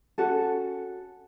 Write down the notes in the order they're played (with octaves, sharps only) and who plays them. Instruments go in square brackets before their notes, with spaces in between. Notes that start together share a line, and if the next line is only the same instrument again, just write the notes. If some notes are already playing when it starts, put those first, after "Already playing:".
[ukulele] C#4 F#4 A4